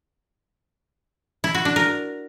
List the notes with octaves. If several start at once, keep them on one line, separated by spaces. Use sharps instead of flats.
E4
F#4
D4
A#4